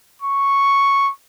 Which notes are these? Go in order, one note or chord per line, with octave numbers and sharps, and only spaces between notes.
C#6